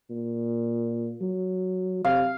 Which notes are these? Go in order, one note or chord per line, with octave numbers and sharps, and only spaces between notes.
A#2
F#3
C3 F5